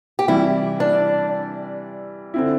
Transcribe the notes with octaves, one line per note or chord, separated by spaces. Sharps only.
G4
C3 E3 G3 E4
D4
D3 C4 E4